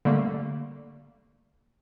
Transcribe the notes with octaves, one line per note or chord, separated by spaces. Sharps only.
D3 G3 A3 A#3